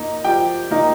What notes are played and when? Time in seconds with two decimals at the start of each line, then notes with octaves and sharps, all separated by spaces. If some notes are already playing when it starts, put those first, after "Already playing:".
Already playing: A#3 D#4
0.25 F3 G4 G5
0.71 A#3 D#4